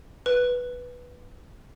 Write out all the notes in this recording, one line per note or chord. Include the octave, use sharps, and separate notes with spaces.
B4